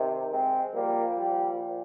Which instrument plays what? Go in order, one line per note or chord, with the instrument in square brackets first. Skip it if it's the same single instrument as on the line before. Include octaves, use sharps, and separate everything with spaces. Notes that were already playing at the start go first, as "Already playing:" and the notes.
Already playing: [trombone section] C3 D#3
G#3 C4
A#2 F3 G3 A#3
G3